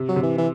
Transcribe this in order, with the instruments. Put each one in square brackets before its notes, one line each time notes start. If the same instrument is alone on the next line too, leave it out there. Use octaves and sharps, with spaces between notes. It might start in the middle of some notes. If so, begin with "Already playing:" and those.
Already playing: [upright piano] C3
[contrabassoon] F#3
[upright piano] C3
[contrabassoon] E3
E3